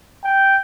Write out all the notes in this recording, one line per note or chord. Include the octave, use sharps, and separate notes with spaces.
G5